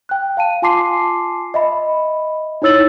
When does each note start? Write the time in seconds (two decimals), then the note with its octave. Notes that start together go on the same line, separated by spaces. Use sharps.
0.09 G5 F#6
0.37 F5 A5 D#7
0.62 F4 G#5 A5 C6 D6 C7
1.54 D#5 E5 B5
2.62 D#4 E4 C#5 E6 A6 F#7